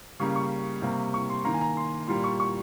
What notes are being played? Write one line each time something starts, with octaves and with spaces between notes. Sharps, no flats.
C#3 G3 A#3 C#6
C#6
C3 G3 A#3
C#6
C6
D#3 A#3 A#5
G#5
A#5
C6
A#2 G3 A#3 C6
C#6
C#6